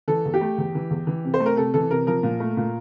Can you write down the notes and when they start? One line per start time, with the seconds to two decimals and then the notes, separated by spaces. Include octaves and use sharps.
0.08 E3 A4
0.25 E2
0.34 G4
0.41 A3
0.58 E2
0.75 E3
0.91 E2
1.07 E3
1.25 C3
1.34 C5
1.40 A3
1.46 A#4
1.57 C3 A4
1.74 E3 A4
1.91 C3 A#4
2.07 F3 A#4
2.23 A#2
2.40 A3
2.57 A#2